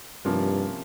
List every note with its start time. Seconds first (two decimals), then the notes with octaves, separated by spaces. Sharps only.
0.25 G2 C3 F3 A#3 C#4 F4